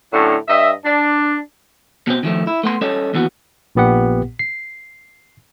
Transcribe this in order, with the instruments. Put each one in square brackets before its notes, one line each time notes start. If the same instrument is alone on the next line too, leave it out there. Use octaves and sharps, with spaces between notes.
[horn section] A2 D3 F#3 C#4 D4
G2 D#5 E5
D4
[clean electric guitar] B2 C4
D#3 F3 A3
E4
A3 B3 C6
G3 C#4 A4 C#5 D#5
D#2 E3 B3 F#4
[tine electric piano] A#1 A#2 B3 G4 F#5
C7